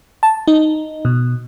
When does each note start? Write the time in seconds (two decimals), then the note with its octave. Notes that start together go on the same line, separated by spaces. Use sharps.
0.23 A5
0.48 D#4
1.05 B2